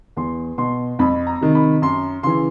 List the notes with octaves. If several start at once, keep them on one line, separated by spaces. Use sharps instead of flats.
E2 C6
B2 C6
F2 B5
A#5
C3 D#3
B5
F#2 C6
C#3 E3 C6